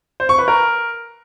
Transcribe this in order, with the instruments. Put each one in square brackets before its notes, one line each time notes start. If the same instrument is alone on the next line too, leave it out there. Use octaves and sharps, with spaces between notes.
[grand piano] C5
C#6
B4
A#4